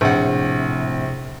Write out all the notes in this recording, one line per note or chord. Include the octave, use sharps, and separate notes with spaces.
A#1 A2 C3 F#5